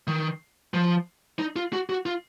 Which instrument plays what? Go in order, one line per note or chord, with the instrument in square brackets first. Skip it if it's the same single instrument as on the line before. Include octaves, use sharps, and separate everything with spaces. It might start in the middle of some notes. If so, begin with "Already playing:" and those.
[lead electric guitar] D#3
F3
D#4
F4
F#4
F#4
F4